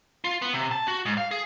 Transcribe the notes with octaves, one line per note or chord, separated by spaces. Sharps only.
F4
B3
C3
A5
F#4
G#2
F5
G#4